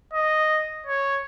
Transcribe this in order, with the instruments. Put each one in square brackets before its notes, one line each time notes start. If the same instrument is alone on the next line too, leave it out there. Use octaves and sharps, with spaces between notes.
[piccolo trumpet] D#5
C#5